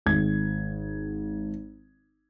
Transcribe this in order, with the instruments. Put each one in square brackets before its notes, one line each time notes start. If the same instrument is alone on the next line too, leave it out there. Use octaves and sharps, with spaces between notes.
[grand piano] G#1 G#6